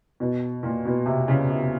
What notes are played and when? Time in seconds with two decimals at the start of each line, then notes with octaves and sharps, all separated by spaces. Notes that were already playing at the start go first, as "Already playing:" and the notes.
0.20 B2
0.63 A#2
0.85 B2
1.06 C3
1.28 C#3
1.49 C3